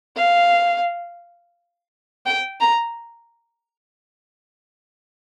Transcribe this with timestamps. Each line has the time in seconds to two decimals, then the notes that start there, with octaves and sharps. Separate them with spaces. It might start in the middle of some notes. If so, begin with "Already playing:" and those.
0.16 F5
2.26 G5
2.60 A#5